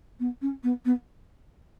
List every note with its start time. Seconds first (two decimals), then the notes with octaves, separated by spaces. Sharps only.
0.19 B3
0.41 C#4
0.63 B3
0.85 B3